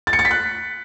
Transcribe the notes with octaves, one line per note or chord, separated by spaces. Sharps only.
A6
C#7
A6
B6
F#6